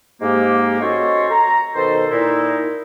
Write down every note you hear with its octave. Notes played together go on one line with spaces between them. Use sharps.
G#2 A#3 G4
C#4 F#4 A4 C5 C#5 D#5
A#5
B2 D#3 A4 C5
A#2 D#4 E4